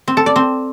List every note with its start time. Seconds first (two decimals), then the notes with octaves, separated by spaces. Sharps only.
0.08 C4
0.17 A4
0.26 D5
0.36 C4